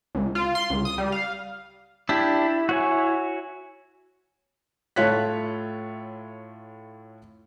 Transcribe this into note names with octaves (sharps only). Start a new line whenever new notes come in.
C#2
F4
C6
C#2
D#6
G3
F5
D4 E4 G4
F#4 C#5 G#5
A2 A3 F4 C#5 F#6 B6